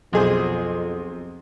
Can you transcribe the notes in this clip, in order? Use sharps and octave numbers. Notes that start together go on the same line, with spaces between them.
B1 F2 G#4 C5